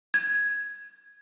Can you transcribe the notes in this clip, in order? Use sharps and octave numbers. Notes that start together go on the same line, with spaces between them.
G#6